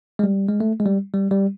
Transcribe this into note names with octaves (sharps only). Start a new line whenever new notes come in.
G#3
G3
G#3
A3
G#3
G3
G3
G3